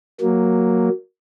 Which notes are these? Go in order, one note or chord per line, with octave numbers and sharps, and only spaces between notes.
F#3 A#3